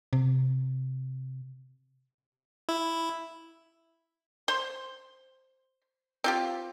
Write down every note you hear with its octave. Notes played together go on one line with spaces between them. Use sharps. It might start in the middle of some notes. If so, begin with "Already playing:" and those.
C3
E4
C5 C6
C4 F4 G4